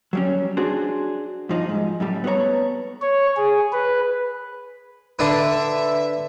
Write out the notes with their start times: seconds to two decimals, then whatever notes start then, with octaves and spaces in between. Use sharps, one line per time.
0.13 F#3 G3 C#4
0.57 D4 F#4 G#4 C5
1.49 G2 F3 D#4
1.69 G#2
2.00 F#2 A2 G3
2.24 B3 F4 A4 C#5 A#5
3.02 C#5
3.36 G#4
3.73 B4
5.19 D3 D4 B4 E5